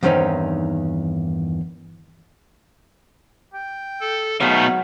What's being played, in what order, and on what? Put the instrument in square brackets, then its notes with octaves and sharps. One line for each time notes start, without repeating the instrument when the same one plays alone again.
[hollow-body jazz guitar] E2 G2 D#3 C4 C#4 D#4
[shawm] G5
[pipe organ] A4
[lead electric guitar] B2 [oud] F#3 G#3 [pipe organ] A3 B3 D#4 [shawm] F5